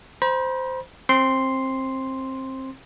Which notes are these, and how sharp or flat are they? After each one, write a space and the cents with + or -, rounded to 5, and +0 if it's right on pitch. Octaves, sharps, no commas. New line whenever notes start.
C5 -10 B5 -45
C4 +20 C6 +0